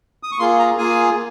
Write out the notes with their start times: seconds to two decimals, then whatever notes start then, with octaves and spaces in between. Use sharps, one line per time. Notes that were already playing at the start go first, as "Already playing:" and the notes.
0.23 D#6
0.31 C#6
0.39 A#3 F4 G#4 C6
0.59 A#5
0.78 A#3 F4 G#4 G#5